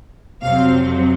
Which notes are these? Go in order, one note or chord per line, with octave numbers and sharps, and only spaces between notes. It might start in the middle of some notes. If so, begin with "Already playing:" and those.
F2 C3 F#3 C4 F5